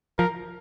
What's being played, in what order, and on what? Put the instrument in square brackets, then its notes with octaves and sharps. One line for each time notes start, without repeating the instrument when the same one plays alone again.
[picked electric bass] F3 [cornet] A#4